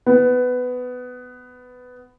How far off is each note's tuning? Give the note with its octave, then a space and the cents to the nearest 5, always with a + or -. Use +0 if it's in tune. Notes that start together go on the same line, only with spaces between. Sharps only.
B3 +15